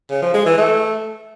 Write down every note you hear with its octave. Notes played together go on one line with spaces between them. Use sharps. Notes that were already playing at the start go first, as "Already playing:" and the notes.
C#3
F3
G#3
E3
A3